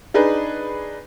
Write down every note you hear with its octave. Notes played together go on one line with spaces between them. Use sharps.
D4 D#4 G#4 B4